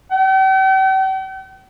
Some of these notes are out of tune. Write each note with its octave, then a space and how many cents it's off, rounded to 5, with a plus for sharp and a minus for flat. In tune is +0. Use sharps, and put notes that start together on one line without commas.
G5 -45